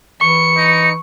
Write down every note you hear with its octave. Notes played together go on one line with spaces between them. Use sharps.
E3 C#6 C#7
D#4